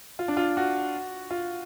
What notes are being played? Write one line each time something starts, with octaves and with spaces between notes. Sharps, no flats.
F4
D4
F4
F#4
F4